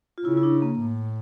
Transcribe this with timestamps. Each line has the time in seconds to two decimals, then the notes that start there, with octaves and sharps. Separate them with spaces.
0.18 F4
0.25 C#3 E4
0.37 E4
0.43 D4
0.62 A#3
0.80 A2